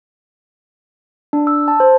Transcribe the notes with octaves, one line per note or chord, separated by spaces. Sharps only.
D4
E6
A5
C5